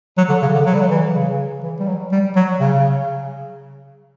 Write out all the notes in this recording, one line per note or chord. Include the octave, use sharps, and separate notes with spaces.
F#3
D3
C#3
D3
F#3
G3
F#3
E3
C#3
E3
G3
F#3
G3
F#3
C#3